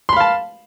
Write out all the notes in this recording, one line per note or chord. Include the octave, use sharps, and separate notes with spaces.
F5 A5 B5 C6